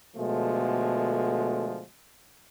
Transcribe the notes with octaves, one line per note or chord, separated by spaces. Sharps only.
B2 D3 F3 G#3 A3